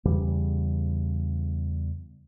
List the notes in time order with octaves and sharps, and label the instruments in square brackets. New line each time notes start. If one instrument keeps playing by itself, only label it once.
[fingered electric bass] E2 C#3 G3